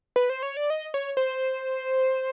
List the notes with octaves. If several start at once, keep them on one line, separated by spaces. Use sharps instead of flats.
B4
C5
C#5
D5
D#5
C#5
C5